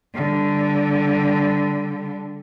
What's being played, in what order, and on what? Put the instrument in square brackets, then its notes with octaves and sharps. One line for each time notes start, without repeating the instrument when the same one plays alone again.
[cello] D3 G3